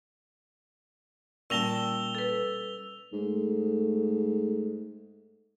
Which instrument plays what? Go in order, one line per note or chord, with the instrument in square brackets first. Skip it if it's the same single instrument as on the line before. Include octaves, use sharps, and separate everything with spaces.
[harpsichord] A#2 A5 [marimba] G3 C#4 [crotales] E6 F7 G7
[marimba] A4 B4
[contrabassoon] G#2 [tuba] A3